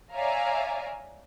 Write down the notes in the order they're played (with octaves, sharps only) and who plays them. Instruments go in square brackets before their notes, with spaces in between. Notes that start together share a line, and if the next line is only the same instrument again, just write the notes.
[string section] C#5 D5 E5 F5 G#5 A#5